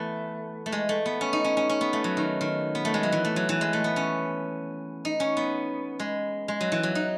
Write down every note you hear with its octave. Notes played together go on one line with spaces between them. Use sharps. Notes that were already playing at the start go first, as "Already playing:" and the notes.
Already playing: E3 A3 B3
A3
G#3
A3
B3
C#4
D#4
C#4
C#4
C#4
B3
A3
F#3
D#3
D#3
B3
A3
G#3
F#3
E3
A3
F#3
E3
G#3
A3
B3
C#4
D#4
C#4
B3
G#3
G#3
F#3
E3
F#3
D#4